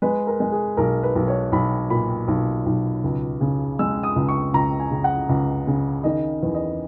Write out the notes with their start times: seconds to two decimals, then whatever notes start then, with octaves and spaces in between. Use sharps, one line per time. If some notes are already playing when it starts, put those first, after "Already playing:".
0.02 G#3 B4
0.27 A#4
0.40 G#3
0.52 G#4
0.77 B1 A#4
1.03 B4
1.16 B1
1.28 C#5
1.52 B1 B5
1.90 A#2 B5
2.28 B1
2.66 B1
3.04 C#2
3.41 C#3
3.79 G#3 E6
4.03 D#6
4.16 C#2
4.28 C#6
4.53 C#2 A#5
4.80 G#5
4.91 C#3
5.04 F#5
5.29 C#2
5.67 C#3
6.04 D#3 D#5
6.43 E2
6.55 D#5